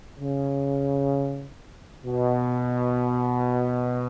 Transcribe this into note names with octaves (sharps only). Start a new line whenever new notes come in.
C#3
B2